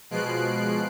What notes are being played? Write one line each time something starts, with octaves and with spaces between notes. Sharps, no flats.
B2 F3 G#3 F#6 C7 D7